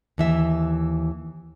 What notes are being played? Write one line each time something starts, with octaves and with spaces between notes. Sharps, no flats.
D#2 E3 E5